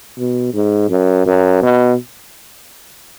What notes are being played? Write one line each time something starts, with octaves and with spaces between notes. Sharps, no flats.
B2
G#2
F#2
F#2
B2